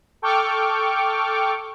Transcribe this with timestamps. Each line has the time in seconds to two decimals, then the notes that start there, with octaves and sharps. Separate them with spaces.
0.22 A4 G5 C#6 D6 F6